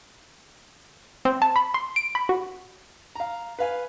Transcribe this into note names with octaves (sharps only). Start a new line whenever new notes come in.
C4
A5
B5
C6
D7
B5
F#4
F5 A#5
B4 F5 G#5